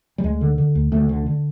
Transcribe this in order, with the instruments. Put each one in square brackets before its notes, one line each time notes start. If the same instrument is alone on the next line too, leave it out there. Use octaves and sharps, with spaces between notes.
[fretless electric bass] G3
D2 G#3
D3
D3
D2
D2 A3
D3
D3